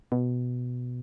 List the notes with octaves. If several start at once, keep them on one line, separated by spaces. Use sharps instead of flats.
B2